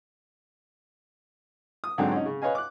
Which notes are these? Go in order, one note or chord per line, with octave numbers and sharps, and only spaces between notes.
D#6
G#2 D3 F#3 C4
C#4 D#4
C#3
B4 C#5 D#5 F5 G#5
D6 F#6